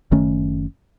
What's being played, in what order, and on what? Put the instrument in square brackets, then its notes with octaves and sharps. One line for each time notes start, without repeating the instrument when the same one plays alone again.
[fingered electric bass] F#1 D#3 A3 C#4